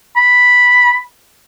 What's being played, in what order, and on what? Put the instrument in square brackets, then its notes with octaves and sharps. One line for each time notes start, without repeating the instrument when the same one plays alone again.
[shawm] B5